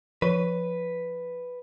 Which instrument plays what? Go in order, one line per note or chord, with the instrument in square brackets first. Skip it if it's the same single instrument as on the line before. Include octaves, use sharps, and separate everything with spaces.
[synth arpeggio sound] F3 C#5 D#7 [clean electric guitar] B4